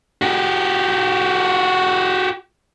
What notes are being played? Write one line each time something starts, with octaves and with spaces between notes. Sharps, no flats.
F#4 G4